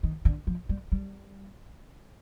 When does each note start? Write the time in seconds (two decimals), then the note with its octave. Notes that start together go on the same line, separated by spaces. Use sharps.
0.03 D#3
0.25 D3
0.47 F3
0.69 G3
0.92 G3